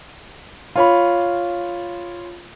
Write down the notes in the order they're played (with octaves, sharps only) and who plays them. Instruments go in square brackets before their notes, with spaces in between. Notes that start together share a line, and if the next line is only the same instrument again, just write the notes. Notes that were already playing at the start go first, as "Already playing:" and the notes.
[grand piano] F4 C#5 B5